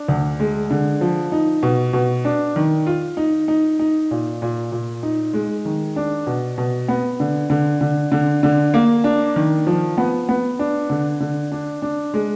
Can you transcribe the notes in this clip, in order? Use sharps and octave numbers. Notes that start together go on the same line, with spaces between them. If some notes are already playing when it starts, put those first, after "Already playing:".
Already playing: D4
D2
G#3
D3
F3
D#4
B2
B2
D4
D#3
F4
D#4
D#4
D#4
A#2
A#2
A#2
D#4
G#3
D#3
D4
B2
B2
B3
D3
D3
D3
D3
D3
A#3
D4
D#3
F3
B3
B3
D4
D3
D3
D4
D4
G#3